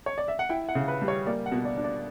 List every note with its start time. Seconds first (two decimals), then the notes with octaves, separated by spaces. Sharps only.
0.06 C#5
0.18 D5
0.28 E5
0.39 F#5
0.49 E4 G5
0.69 F#5
0.75 C#3
0.88 B4
1.02 G3
1.08 C#5
1.27 A#3 D5
1.46 F#5
1.52 B2
1.65 D5
1.77 D4
1.84 D5